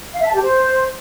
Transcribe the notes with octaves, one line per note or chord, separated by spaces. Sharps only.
F5
E5
A5
G4
C5